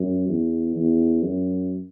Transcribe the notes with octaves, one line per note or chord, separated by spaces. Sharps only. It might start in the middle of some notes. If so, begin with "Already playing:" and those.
Already playing: F#2
E2
E2
F#2